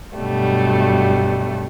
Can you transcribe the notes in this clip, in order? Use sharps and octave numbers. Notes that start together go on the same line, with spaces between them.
G2 B2 F#3 G3 A3